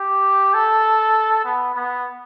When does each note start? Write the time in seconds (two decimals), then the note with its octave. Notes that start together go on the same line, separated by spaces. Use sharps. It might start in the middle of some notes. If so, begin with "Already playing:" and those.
Already playing: G4
0.54 A4
1.45 B3
1.75 B3